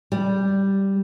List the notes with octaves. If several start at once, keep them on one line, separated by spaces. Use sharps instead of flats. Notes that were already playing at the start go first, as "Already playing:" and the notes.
G3